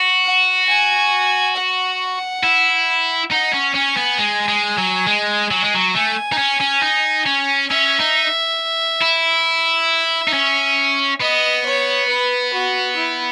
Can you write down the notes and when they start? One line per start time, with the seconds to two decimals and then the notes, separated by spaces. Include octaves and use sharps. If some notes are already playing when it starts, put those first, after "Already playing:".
Already playing: F#4
0.24 F#5
0.68 G#5
1.56 F#5
2.44 E4
3.31 D#4 F#5
3.54 C#4
3.75 C#4 G#5
3.98 B3
4.19 G#3
4.48 G#3
4.78 F#3
5.07 G#3
5.51 F#3
5.62 G#3
5.74 F#3
5.95 A3 G#5
6.33 D#4
6.39 C#4
6.61 C#4
6.83 D#4
7.26 C#4
7.70 C#4 E5
8.00 D#4
9.02 E4
10.28 D#4
10.34 C#4
11.21 B3 D#5
11.66 C#5
12.08 B4
12.53 F#4
12.96 E4